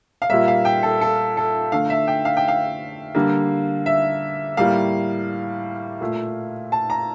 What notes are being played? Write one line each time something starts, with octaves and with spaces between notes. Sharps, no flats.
F5
A#2 G3 A#3 E5
F5
G5
A4
A4
A4
D3 A3 F5
E5
G5
F5
G5
F5
D3 G3 A#3
E5
A2 G3 A#3 F5
A#2 A3
A5
A#5